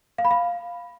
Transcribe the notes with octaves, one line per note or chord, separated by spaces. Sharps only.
F5
B5
F5